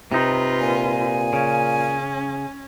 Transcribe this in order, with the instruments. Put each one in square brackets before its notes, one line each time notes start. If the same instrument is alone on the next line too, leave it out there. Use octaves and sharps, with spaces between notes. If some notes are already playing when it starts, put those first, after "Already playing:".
[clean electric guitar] C3 D#4 [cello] F4 B4
[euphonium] A#2 [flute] G#5
[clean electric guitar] C#3 [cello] C#4